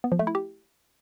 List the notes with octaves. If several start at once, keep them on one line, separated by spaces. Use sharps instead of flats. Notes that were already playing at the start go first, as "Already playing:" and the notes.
B3
F3
A3
E4
G4